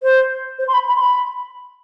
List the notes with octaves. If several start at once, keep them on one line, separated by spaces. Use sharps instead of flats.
C5
C5
C6
B5
B5
C6
B5